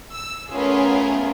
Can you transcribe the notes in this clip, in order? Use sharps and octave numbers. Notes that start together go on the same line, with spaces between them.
E6
A3 B3 C#4 F4 G#4 A#4